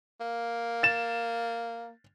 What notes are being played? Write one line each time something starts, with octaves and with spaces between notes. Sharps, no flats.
A#3
A6 E7